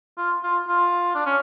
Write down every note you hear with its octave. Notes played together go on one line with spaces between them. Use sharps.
F4
F4
F4
D4
C#4